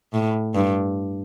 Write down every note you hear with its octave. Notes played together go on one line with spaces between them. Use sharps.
A2
G2